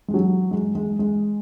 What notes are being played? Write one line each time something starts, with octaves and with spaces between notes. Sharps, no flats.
G#3
F#3
G#3
G#3
G#3